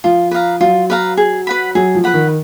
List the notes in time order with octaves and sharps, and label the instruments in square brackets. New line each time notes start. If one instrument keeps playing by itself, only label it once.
[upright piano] F3 [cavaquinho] F4
[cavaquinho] B4 F5 A#5
[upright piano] F#3 [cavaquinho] F4
[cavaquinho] B4 F5 A#5
G#4
B4 F#5 B5
[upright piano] F#3 [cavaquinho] G#4
[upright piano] F3
[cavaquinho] B4 F#5 B5
[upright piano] D#3